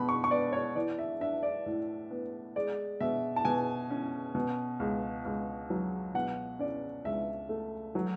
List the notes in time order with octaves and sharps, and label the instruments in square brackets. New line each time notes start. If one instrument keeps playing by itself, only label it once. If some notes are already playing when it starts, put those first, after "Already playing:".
Already playing: [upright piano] B2 B5
C#6
C#6
B3 D5
C#5
E3 D5
E5
D4 E5
D5
A2
B3
G#3 D5
B2 E5
A5
B2 G#5
C#4
B2
C#2
C#2
F#3
B2 F#5
C#4 D5
C#2 E5
A3
F#3